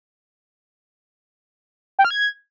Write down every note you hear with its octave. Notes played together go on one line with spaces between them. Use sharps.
G5
F6
G#6